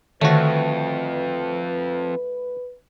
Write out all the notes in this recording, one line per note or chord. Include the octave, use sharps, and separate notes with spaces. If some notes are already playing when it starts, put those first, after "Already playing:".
F2 D3 D#3 A3 F#4 B4